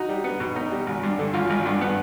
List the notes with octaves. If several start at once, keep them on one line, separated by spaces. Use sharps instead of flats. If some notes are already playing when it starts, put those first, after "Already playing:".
Already playing: D#4 F#4
G3
B3
B2
D#4
G3
G#1
G2
D3
G#1 F4
G#1
G2
B3